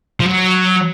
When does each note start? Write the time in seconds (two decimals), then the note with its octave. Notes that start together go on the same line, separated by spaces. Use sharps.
0.20 F3
0.26 F#3